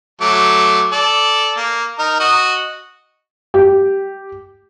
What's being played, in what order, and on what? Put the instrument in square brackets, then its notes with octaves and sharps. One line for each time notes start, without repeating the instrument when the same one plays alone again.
[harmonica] F#3 A3 D6
A4 D5
A#3
D#4 A#4
F#4 D#5
[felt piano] G4